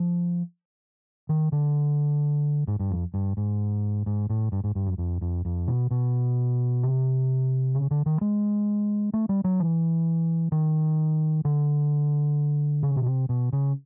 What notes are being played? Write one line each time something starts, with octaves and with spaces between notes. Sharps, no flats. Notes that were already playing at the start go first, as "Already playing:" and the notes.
Already playing: F3
D#3
D3
G#2
G2
F2
G2
G#2
G#2
A2
G2
G#2
G2
F#2
F2
F2
F2
B2
B2
C3
C#3
D3
D#3
G#3
A3
G3
F#3
E3
D#3
D3
C#3
B2
C3
B2
C#3